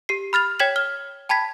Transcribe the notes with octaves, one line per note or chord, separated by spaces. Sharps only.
G4 C7
B5 F6 A6 F7
C#5 G5 G#6 B6 E7 F#7
F6 G7
G5 A5 B5 G#6 B6